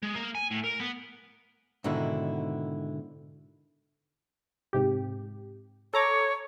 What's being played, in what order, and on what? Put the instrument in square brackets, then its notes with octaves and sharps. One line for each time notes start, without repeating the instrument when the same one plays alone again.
[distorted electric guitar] G#3
A#3
G#5
A2
A#4
B3
[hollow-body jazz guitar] G#2 B2 D3 D#3 D4 E4
[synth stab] G#2 C3 G4
[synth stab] A4 A#5 D6 [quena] C#5